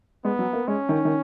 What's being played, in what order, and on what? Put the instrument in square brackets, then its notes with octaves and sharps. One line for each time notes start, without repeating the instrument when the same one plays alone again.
[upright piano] G#3 [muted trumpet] B3
[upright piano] F#3
A#3
[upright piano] G#3 [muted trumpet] C#4
[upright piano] D#3
D#3